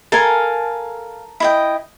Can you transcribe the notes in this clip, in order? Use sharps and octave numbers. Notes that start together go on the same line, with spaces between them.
A4 A#4 F5 G#5
E4 D#5 G5